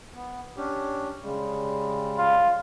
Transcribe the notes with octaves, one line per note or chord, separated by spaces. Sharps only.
B3
C#4 D4 G4
C#3 G3 G#3
F4